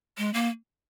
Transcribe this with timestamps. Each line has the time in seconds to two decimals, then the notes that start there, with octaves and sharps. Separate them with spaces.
0.18 G#3
0.34 A#3